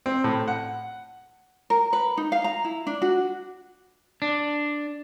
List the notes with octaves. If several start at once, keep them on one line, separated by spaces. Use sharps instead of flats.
C4
A2
F#5
A#4
B4
D#4
F5
A#5
E4
D4
F#4
D4